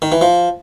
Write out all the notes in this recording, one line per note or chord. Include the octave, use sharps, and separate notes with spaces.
D#3
E3
F3